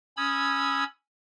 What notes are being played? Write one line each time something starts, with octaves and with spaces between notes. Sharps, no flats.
C#4 B5 D#6 E6 G#6